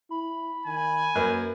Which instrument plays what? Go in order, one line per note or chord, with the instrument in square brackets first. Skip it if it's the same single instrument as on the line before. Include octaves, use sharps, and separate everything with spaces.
[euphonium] E4 [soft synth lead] B5
[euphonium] D#3 [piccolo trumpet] G#5
[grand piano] F#2 B4 [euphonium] A#3